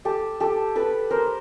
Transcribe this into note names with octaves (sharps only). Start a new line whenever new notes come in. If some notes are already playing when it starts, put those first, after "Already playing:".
G4 A4
G4 A4
A4 B4
A#4 C5